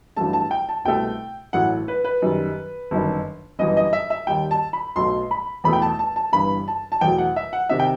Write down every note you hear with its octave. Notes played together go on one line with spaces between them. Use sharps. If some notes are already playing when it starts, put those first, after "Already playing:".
A1 G2 F#3 A3 A5
A5
G5
A5
C2 B2 A3 G5
A1 A2 F#3 A3 F#5
B4
B4
F#2 D#3 G3
G1 F#2 D#3
G1 F#2 E3 G3 D#5
D#5
E5
E5
D#2 D#3 G3 G5
A5
B5
B1 B2 F#3 A3 C6
B5
E2 B2 A3 B5
G5
A5
A5
A5
G1 G2 E3 B5
A5
A5
E2 B2 F#3 A3 G5
F#5
E5
F#5
C3 D#3 E5
G5